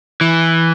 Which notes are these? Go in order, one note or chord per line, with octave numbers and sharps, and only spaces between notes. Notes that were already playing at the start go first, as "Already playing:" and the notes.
E3